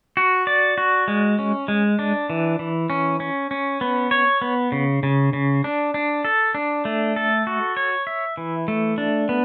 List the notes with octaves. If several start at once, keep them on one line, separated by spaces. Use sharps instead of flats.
F#4
D5
F#4
G#3
C#4
G#3
D4
E3
E3
C#4
C#4
C#4
B3
C#5
B3
C#3
C#3
C#3
D4
D4
A4
D4
A3
A4
F#4
C#5
E5
E3
A3
D4
B3